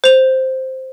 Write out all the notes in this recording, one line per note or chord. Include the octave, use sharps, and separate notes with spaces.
C5 F7